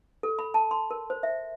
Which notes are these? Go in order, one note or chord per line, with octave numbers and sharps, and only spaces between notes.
A4
B5
A5
C6
A#4
C5
E5